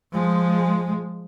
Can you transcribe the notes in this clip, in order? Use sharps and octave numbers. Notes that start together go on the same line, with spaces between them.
F3 G#3